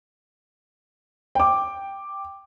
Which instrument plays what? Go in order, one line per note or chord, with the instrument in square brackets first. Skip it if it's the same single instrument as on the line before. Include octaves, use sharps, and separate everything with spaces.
[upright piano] G5 D6